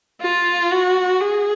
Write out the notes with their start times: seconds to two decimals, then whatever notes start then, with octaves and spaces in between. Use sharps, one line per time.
0.22 F4
0.71 F#4
1.21 G#4